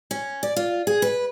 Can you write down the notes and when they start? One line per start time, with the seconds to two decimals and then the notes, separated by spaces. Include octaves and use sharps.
0.11 C#4
0.43 D5
0.56 F4
0.87 G#4
1.02 B4